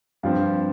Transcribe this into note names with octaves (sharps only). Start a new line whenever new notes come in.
G2 F3 C4 F5